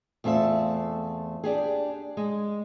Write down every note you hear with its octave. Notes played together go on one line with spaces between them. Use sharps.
E2 A3 C4 F4 E5
D4 G4 G#4
G#3